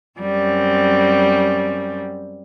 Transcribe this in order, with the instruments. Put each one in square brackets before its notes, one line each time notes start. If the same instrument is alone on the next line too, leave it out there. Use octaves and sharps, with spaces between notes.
[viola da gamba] F#2 G3 C4